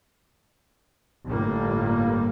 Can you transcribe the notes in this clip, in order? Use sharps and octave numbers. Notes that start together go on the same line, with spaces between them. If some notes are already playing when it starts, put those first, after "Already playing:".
G1 A2 G3 A#3